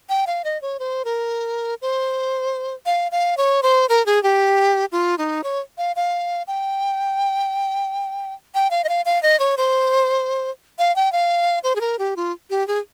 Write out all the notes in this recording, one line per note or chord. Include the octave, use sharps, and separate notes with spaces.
G5
F5
D#5
C#5
C5
A#4
C5
F5
F5
C#5
C5
A#4
G#4
G4
F4
D#4
C#5
F5
F5
G5
G5
F5
D#5
F5
F5
D#5
C#5
C5
F5
G5
F5
C5
G#4
A#4
G4
F4
G4
G#4